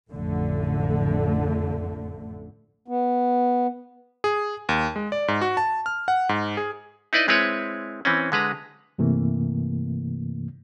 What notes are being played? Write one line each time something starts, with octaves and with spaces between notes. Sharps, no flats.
A1 F2 D3 A3
B3
G#4
D#2
G#3
D5
G#2
F#4
A5
F6
F#5
G#2
G#4
D#4 E4 B4 D5 D#5
G#3 C4 E4 B4 C#5
E3 C4 C#4
D3 G#3 B4 A#5
G2 C3 E3 A3 A#3